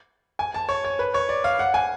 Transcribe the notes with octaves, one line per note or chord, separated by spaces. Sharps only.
G#5
A5
C#5
C#5
B4
C#5
D5
F5
F#5
G#5